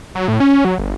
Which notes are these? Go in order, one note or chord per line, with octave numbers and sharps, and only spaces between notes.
F#3
A2
C#4
F#3
G1